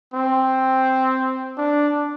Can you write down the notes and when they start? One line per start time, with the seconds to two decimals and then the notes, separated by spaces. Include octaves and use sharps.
0.14 C4
1.58 D4